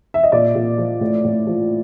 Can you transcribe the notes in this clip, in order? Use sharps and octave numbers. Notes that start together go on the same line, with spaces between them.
E5
D#5
A#2 D5
A#2
F3
A2
A2
F3